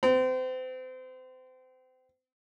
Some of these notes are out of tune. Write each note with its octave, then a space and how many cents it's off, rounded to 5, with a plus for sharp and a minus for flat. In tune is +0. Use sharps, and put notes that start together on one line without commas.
C4 -30